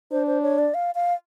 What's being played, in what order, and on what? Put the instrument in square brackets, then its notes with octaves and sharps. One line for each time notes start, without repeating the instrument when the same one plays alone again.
[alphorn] D4 [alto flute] C5
[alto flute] C5
C#5
D5
F5
F5